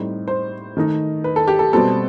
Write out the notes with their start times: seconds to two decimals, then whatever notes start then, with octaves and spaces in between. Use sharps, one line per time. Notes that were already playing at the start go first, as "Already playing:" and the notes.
Already playing: A2 G3 C4 D#4
0.28 C5
0.77 D#3 A3 D#4
1.24 B4
1.36 A4
1.48 G4
1.59 A4
1.73 B2 G3 C4 A4